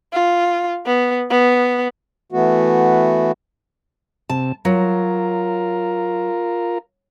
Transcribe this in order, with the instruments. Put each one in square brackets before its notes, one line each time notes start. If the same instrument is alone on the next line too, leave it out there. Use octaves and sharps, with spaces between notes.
[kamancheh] F4
B3
B3
[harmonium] E3 A3 B3 F#4
[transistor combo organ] C3 [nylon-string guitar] A5
[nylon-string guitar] F#3 [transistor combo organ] F4 A#4